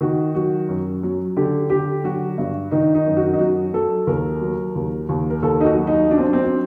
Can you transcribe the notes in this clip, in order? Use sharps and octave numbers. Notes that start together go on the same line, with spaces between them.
D#3 F#4
F#3 F#4
F#2
F#3
D3 G4
D3 G4
F#3 F#4
G2
D#3 D#4
D#4
F#2
F#4
D#4
F#3 F#4
F#3 A4
D#2 A#4
F#3
D#2
D#2
A#4
D#2 A4
D#4
F#4
F#3
D#4
F#3 D4
C4
D4
C4
F#3